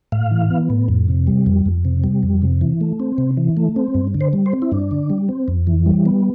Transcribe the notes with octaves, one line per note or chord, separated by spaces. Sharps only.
A2 F5
E3
B3
A2
F2
C3
G3
F2
F2
C3
G3
F2
C3
E3
A3
C4
C3
E3
A3
C4
G2
D3
C5
G3
C5
C4
E4
G2 D4
D3
G3
C4
F2
E3
G3
B3